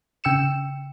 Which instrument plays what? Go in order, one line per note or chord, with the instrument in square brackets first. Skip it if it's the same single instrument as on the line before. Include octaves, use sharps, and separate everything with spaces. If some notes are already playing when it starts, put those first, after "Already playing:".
[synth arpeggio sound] C#3 G5 E6 C#7 E7